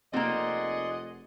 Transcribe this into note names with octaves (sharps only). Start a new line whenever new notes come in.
F1 A#3 C4 G#4 D5 D#5 F#5 C6